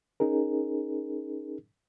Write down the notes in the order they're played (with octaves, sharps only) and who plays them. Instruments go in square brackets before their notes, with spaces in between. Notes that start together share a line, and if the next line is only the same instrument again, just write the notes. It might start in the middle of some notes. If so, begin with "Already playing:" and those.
[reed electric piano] C#4 D#4 G#4 A#4